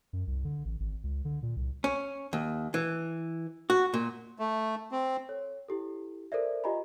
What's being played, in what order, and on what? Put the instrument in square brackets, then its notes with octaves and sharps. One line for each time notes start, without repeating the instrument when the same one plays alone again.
[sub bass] F#2
C2
D3
A1
G#1
C#2
D3
A#2
C2
[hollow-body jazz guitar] C#4
D#2
E3
F#4
A#2
[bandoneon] A3
C4
[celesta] A4 C#5
E4 G4 A4
A4 A#4 C5 D5 E5
F4 G4 D#5 G#5 A#5 B5